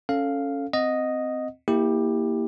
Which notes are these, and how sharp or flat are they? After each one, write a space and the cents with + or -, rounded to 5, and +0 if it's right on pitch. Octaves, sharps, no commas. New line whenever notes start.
C#4 +0 A4 +5 F5 +0
C4 -15 D#5 +0 F#5 -25
A#3 +0 E4 -20 G4 +15